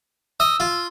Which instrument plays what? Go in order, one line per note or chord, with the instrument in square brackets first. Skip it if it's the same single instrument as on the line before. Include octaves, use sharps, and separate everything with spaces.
[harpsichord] D#5 [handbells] E6
[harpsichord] F4